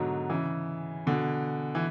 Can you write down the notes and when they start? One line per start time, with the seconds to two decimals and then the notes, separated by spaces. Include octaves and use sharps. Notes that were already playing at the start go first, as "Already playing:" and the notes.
Already playing: G#2 B2 D3 F#3
0.30 C#3 E3
1.07 B2 D3
1.75 E3